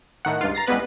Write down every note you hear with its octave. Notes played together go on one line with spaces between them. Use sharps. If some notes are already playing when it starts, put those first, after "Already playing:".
A2 D#3 F#5
C#2 G2 F4
A#5 A6 A#6 C7
A1 G3 G#3 B3 B4 F#6